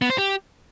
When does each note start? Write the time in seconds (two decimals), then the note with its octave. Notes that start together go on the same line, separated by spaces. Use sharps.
0.02 B3
0.10 C5
0.18 G4